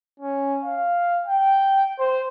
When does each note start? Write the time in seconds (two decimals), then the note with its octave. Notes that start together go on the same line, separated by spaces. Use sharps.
0.20 C#4
0.65 F5
1.25 G5
1.99 C5